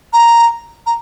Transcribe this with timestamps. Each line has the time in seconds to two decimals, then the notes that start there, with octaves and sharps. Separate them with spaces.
0.13 A#5
0.86 A#5